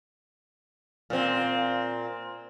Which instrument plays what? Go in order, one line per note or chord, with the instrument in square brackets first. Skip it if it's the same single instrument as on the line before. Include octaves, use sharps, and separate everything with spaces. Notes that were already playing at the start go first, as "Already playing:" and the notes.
[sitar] A#2 C4